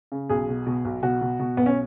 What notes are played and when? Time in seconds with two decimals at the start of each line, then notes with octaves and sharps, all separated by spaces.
0.12 C#3
0.29 B1 G#4
0.49 B2
0.66 B2
0.85 B1
1.03 B2 F#4
1.21 B2
1.40 B2
1.57 B1 B3
1.66 C#4